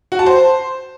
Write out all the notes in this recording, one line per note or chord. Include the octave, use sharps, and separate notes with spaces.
F#4
A5
C5